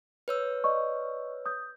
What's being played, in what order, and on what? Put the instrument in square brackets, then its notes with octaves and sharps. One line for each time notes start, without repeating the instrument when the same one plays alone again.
[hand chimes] B4 C#5 E6
[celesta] D5 D#5 C#6
D#6 G6